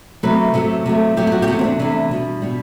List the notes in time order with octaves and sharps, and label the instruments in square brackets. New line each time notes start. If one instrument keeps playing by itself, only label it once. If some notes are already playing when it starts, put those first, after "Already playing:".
[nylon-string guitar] C3 F#3 A3 B4
C3 F#3 A3 A4
C3 F#3 A3
C3 F#3 A3 G4
E4
F#4
G4
C3 E3 A3 F#4
C4
D4
C3 E3 A3 D4
B2 G3
B2 G3